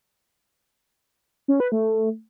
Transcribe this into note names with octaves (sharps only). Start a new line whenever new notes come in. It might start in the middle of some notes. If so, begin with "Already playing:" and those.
C#4
B4
A3